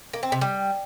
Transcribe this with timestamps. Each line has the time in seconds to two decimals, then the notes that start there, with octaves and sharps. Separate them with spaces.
0.13 A#3
0.23 C4
0.32 C3
0.41 G3